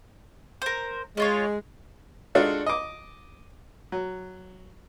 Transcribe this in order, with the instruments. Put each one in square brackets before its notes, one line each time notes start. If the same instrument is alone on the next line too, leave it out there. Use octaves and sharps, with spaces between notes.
[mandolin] A#4 C5
[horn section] G#3 [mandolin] C#4 F4 C#5
[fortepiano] G#3 D4 D#4 F4 F#4 A4
D#5 D6
F#3